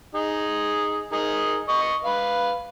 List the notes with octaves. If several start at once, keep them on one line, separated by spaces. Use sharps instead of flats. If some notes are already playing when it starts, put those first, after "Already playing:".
D#4 G#4
D#4 G#4 A#4
D#5 C#6
B4 F5